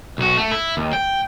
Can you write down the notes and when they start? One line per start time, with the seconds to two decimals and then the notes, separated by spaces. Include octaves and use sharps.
0.18 B1 F#4
0.37 A3
0.51 E4
0.77 D#2
0.93 G5